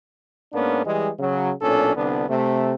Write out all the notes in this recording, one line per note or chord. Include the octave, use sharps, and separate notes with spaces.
G#2 A#3 B3 C#4 D4
E3 G3 G#3
C#3 F#3
B1 A#2 C#4 D4 A4
C2 D3 B3 D4
C3 A3